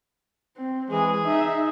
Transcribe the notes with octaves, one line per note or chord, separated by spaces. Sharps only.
C4
E3 G#3 G#4
D#4 E5